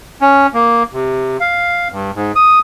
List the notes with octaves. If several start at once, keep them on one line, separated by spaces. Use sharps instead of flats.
C#4
A#3
C3
F5
G2
G#2
D#6